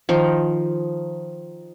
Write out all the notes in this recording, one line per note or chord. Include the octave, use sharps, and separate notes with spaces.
D#3 F3